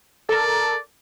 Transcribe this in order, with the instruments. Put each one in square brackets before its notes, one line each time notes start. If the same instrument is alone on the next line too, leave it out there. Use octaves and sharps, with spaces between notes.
[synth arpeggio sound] A4 A#4 [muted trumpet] D5